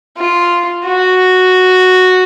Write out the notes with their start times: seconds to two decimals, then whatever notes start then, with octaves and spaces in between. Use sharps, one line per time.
0.17 F4
0.85 F#4